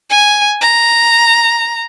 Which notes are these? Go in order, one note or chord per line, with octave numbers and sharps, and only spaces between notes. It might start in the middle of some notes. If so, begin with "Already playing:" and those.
G#5
A#5